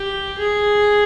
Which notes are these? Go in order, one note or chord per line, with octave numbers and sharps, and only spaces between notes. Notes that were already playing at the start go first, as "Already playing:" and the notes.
Already playing: G4
G#4